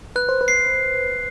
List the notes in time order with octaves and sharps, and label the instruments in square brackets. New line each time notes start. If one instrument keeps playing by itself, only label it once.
[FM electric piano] B4 [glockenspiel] F#6
[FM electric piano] C5
B4
[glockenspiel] C7